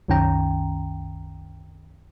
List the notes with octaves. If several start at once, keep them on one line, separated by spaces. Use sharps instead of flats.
C2 F#2 D#3 C#4 G5 A#5